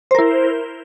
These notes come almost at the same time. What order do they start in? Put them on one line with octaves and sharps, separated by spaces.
C5 A#4 E4